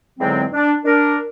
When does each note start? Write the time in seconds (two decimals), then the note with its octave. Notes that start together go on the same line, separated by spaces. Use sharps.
0.19 E2 G#2 D3 F#3 G#3 C4
0.53 D4
0.84 D4 A#4